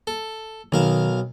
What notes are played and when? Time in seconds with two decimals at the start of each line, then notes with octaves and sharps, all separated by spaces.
0.07 A4
0.72 B1 D#3 A#4 F5